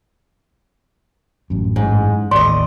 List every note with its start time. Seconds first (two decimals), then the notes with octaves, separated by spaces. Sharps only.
1.50 A1 F#2
1.76 G#2
2.31 A1 D#2 D5 D#5 C6